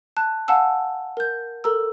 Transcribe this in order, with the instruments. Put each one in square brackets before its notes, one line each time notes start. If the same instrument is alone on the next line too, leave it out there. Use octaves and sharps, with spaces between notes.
[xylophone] A5 F#6
F5 F#5 G#5 A5 E6
A#4 G6
A4 A#4 A#5 E6